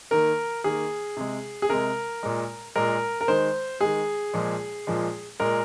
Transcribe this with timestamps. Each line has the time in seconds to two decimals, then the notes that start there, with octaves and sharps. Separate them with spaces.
0.11 D#3 A#3 A#4
0.64 D#3 A#3 G#4
1.17 C3 G#3
1.62 G#4
1.69 C3 G#3 A#4
2.23 A#2 G#3
2.76 A#2 G#3 A#4
3.21 A#4
3.28 D#3 G#3 C5
3.81 D#3 G#3 G#4
4.34 A#2 F3 G#3
4.87 A#2 F3 G#3
5.40 A#2 G#3 A#4